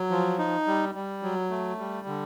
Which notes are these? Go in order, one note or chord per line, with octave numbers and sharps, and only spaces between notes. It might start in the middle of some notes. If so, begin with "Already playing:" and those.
Already playing: F#3
F3
D#4
G3
G3
F#3
A3
G3
D3